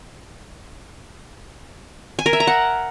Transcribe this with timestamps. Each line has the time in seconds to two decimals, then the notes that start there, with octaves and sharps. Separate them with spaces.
2.19 G#5
2.26 A#4
2.33 E5
2.40 A#5
2.47 F#5